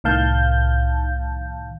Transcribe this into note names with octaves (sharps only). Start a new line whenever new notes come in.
C2 A2 D#3 F5 A5 G6